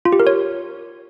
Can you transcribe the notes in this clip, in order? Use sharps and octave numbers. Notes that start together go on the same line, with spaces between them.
F4
G4
A#4
C#5